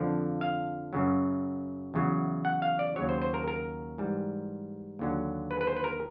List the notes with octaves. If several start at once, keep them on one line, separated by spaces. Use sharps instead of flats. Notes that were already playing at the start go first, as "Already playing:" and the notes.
Already playing: F2 D3 F3 F5
F5
F#2 C#3 F#3
E2 C#3 F#3
F#5
F5
D5
D#2 C#3 F#3 C#5
C5
C5
A#4
A#4
G#2 E3 G3
D#2 D3 F#3
B4
B4
C5
B4
A#4